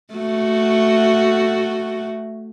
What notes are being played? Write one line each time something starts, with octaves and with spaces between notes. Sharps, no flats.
A3 F#4